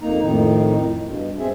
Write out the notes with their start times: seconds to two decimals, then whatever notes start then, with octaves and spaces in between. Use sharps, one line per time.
0.02 F2 A#3 D#4 A#5
0.21 F2 A2 D#3 D#4
1.06 G2 B2
1.39 G2 C4 G#4 E5